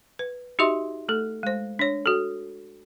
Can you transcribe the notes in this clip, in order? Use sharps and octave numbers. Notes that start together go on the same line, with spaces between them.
B4
D#4 F#4 G4 D#5 E5 C6
A3 A4
G#3 C5
D4 C#5
F#4 A4